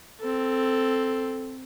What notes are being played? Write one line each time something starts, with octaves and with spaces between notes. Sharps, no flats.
C4 A4